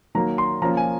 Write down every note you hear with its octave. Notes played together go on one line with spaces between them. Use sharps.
D#3 F#3 A#3 A#5
C6
F3 A#3 C#4 F4 A#5
G#5